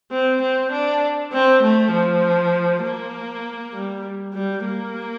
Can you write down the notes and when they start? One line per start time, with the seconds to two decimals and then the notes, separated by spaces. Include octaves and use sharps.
0.11 C4
0.42 C4
0.72 D4
1.33 C4
1.63 A3
1.92 F3
2.84 A#3
3.73 G3
4.34 G3
4.64 A#3